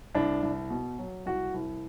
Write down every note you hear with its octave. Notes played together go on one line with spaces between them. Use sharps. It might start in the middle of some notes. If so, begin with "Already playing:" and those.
C2 D4
C2
B2
F#3
C2 F#4
C2